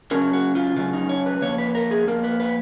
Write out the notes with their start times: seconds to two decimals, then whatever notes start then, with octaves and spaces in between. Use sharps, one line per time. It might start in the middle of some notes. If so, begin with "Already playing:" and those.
0.11 C#3 F#3 C#4 A#4
0.33 F#4
0.55 F4
0.77 C#3 F#3 C#4 F4
0.93 D#4
1.09 C#5
1.26 B4
1.42 F2 D#3 A#3 C#5
1.58 B4
1.75 A#4
1.91 G#4
2.07 F2 D#3 A#3 A#4
2.24 B4
2.40 B4